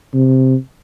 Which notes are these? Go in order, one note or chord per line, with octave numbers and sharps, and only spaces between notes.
C3